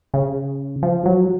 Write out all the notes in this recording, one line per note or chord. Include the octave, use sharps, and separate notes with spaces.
C#3
F3
F#3